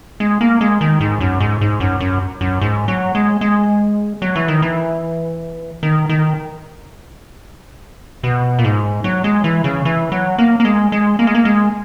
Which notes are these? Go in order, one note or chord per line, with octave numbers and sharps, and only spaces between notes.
G#3
A#3
G#3
D#3
G#2
F#2
G#2
G#2
F#2
F#2
F#2
G#2
F#3
G#3
G#3
F#3
E3
D#3
E3
D#3
D#3
B2
A#2
G#2
F#3
G#3
E3
C#3
E3
F#3
A#3
A#3
G#3
G#3
A#3
G#3
A#3
G#3